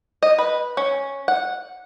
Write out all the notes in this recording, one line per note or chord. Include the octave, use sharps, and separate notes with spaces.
D#5
B4
C#4
F#5